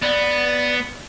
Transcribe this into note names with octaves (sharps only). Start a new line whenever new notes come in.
B3 D5